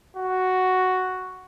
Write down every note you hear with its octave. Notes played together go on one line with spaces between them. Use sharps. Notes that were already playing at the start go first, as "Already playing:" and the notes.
F#4